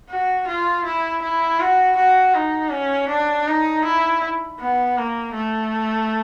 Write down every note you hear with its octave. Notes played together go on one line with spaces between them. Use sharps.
F#4
F4
E4
E4
F#4
F#4
D#4
C#4
D4
D#4
E4
B3
A#3
A3